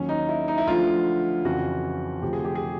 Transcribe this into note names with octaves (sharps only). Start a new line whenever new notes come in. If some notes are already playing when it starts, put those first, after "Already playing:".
Already playing: D#2 D#3 F#3 C#4
D#4
E4
D#4
E4
D2 D3 F3 F4
F2 C#3 E3 F#4
D2 C3 F3 G4
G#4
G4
G#4